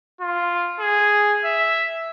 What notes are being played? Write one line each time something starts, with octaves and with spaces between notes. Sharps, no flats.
F4
G#4
E5